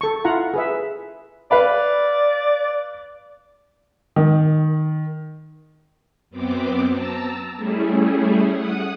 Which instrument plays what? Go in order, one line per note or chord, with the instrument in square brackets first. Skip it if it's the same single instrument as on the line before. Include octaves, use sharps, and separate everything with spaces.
[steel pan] A4 C#6
E4 F4 F#5 A#5
G#4 B4 E5
[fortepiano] B4 F5 B5 [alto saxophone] D5
[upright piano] D#3
[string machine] F#2 B3 C4 D6
A5 A#5 E6
G3 A3 C#4 E4 G#4
F#5 D#6